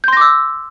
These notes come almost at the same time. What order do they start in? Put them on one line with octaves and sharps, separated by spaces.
G6 C6 A#6 D6 E6